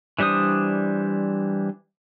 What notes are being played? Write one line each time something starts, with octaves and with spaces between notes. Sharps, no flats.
E3 G3 D4 C5 D#6